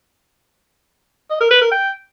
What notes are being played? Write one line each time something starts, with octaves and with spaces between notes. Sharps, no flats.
D#5
A#4
B4
A#4
G5